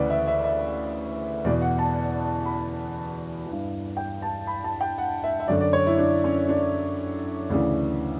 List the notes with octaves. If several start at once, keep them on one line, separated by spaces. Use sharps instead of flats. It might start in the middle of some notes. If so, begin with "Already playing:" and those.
Already playing: D2 C#3 E3 B4 D5
E5
E5
E5
E2 B2 D5
F#5
A5
B5
E3
G2
G5
A5
B5
A5
G5
F#5
E5
E5
F#2 D3 D5
D5
C#5
E4
D4
C#4
D4
D2 C#3 E3 D4